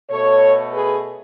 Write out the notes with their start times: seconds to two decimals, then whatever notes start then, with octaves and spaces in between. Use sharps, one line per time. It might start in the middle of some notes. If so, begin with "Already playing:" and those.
0.10 B2 A3 A4 C#5
0.73 G#4 B4